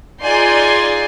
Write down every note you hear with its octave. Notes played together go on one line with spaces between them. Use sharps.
D#4 F4 G#4 D5 G#5 C6